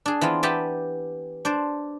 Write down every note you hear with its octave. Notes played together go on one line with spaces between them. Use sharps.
D4 G#4
E3 B3 C4 F4
B3 G4 E5 G5 A5
D4 C5 D5